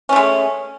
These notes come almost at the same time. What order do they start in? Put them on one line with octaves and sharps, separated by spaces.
C#4 A3 G#3